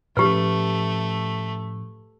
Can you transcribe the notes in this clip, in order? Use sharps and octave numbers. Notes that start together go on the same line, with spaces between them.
A2 F3 A3 C#4 G4 B4